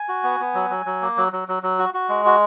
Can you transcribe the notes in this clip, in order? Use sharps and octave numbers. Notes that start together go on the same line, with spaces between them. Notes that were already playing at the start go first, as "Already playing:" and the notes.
Already playing: G#5
F#4
B3
B3
F#3
F#3
F#3
A#3
F#3
F#3
F#3
F#3
F#4
F#4
G#3
F#4